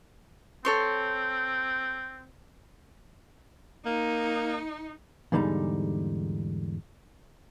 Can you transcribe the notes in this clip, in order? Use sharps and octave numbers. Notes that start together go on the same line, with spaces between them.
C4 A4 C#5 C6
A#3 D#4
E2 G#2 D3 G3 D#4